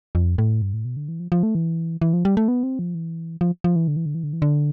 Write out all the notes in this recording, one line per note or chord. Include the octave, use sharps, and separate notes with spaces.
F2
A2
G2
A2
B2
D3
E3
F3
F3
A3
E3
E3
F3
G3
A3
B3
C4
F3
E3
F3
F3
E3
D3
E3
D3
E3
D3
E3
D3